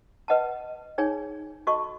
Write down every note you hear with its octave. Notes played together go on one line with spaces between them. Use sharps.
B4 D#5 F#5 A5
D#4 G#4 C#5 G#5
F#4 A4 D#5 A5 C#6